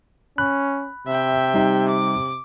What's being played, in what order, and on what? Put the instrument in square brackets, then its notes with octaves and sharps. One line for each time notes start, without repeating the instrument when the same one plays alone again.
[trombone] C#4 [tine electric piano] B5 F#6
[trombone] C3 [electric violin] E5 G5
[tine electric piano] G3 D#4 G4
[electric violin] D6